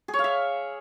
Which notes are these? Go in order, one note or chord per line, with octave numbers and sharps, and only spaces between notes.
G#4
C#5
F5
E5